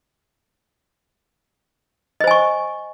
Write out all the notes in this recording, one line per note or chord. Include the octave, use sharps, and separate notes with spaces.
C5 D#5 G#5 C#6